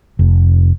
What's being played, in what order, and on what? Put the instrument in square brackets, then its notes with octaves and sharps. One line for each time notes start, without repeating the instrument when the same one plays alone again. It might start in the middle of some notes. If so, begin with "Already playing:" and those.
[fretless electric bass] F1